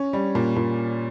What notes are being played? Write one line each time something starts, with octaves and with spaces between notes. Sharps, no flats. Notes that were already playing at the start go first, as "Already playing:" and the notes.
Already playing: C#4
G3
A#2
A#2